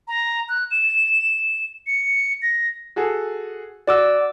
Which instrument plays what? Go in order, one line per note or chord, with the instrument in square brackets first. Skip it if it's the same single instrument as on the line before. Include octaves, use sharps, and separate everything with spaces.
[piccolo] A#5
F#6
E7
C#7
A#6
[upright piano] F#4 G#4 A4
[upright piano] F#4 [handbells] D5 D6 E6